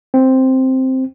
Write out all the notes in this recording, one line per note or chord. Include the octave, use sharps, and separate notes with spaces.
C4